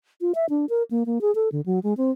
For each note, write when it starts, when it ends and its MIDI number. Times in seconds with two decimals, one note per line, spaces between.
0.21 0.32 65
0.35 0.46 76
0.50 0.66 62
0.69 0.83 70
0.91 1.03 58
1.06 1.21 58
1.21 1.34 68
1.35 1.49 69
1.52 1.61 50
1.66 1.79 54
1.83 1.94 56
1.97 2.11 60